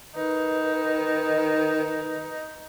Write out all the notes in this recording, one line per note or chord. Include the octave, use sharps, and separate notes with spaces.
D#3 D#4 B4